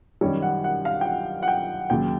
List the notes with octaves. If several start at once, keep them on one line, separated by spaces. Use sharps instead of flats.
F#2 D#3 G3 C#5
F#5
F#5
F5
G5
F#5
F#5
G5
D#2 C#3 F#3 G5